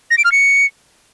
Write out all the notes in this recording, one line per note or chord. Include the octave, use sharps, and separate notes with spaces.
A#6
D7
F6
C#7